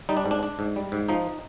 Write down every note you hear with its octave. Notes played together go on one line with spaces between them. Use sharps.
G3 D#4
D4
G#2
D4
D4
G#2
G3
G#2
F3 D#4